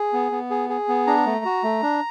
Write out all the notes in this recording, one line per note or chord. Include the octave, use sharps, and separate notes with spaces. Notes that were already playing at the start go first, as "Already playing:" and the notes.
Already playing: G#4
B3
B3
G#4
G#4
B3
D4 A#5
A3
F#4
A3
D4